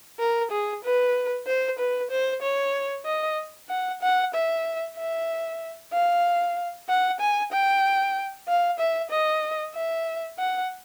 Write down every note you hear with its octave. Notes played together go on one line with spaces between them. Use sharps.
A#4
G#4
B4
C5
B4
C5
C#5
D#5
F#5
F#5
E5
E5
F5
F#5
G#5
G5
F5
E5
D#5
E5
F#5